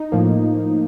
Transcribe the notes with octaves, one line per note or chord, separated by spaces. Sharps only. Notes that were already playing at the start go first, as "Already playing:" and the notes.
Already playing: D#4
A2 F3 A#3